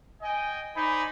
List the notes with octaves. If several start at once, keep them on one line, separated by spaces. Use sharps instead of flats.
D#5 G5 G#5
D#4 C5 D5 G#5 B5